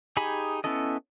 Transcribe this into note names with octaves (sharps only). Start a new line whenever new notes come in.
D#4 G4 G#4 G#5 B5
B3 C#4 E4 A4 D#5